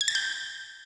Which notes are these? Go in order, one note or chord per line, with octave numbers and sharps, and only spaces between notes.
G#6
A6
G6